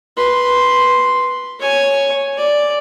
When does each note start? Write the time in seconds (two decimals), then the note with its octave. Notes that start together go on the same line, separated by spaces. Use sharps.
0.17 B4 C6
1.60 C#5 G#5
2.37 D5